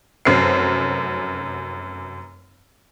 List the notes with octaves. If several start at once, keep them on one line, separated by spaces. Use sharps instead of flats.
F1 F#2 C5 C7